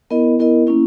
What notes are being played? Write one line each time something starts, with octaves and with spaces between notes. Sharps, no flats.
B3 E4 A#4 D#5
B3 E4 A#4 D#5
A#3 C#4 E4